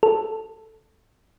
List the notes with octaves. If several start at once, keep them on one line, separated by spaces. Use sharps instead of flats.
A4